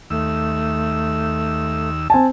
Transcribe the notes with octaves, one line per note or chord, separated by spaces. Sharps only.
D#2 A3 E6
C4 G#5 A5